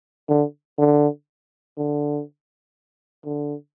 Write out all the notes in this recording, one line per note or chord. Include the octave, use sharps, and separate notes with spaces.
D3
D3
D3
D3